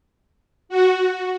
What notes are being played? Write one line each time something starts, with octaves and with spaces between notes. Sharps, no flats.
F#4